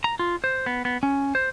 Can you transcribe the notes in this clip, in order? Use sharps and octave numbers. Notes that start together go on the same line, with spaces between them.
A#5
F4
C5
B3
B3
C#4
C5